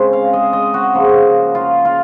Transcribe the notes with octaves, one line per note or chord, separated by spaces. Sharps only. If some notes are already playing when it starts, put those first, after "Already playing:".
Already playing: C#3 G#3 C4
F5
D#5
D#5
F#4
C#3 F3 A#3
F4
F4